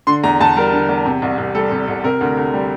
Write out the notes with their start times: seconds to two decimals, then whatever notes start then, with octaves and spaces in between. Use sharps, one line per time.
0.07 D3 C6
0.24 E2 A#5
0.40 E2 A5
0.56 G3 A#4
0.73 D3
0.89 E2
1.06 C3
1.22 C2
1.38 C2
1.55 G3 A4
1.71 C3
1.88 C2
2.04 C3 A#4
2.21 D2
2.37 D2
2.54 G3